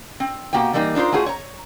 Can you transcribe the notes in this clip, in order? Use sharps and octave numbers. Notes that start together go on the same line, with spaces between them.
C4
B2 A#3 F#4 G4 G5
E3 G3 A#3 D#4
D4 D#4 F4 A#4 C5
A3 F4 F#4 G#4 C5
C#5 A#5